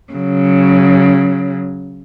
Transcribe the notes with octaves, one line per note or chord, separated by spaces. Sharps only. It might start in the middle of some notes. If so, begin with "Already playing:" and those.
C#3 F#3